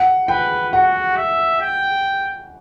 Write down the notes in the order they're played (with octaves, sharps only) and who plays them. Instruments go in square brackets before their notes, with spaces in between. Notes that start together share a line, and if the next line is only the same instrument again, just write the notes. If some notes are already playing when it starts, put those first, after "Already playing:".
Already playing: [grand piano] F#5
[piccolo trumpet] B4 [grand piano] G5
[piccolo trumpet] F#4 [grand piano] F#5
[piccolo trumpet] E5
G5